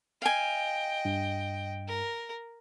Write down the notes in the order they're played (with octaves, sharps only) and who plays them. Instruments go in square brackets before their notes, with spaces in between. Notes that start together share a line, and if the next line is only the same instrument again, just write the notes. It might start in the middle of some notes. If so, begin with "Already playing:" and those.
[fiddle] D#5 G5 [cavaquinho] F5 G#5
[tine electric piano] G2
[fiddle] A#4